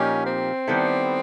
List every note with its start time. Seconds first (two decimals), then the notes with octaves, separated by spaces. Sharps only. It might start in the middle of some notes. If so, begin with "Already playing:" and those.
Already playing: A#2 F3 A#3 C#4 D#4 G4
0.26 C4
0.67 D#3 G3 B3 E4 A4